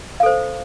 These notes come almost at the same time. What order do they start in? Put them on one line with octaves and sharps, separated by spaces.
F5 A4 C5